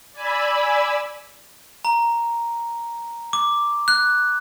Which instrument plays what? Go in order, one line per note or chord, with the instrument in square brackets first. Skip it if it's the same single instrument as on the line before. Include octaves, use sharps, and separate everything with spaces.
[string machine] D5 G#5 B5 E6
[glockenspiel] A#5
D6
F#6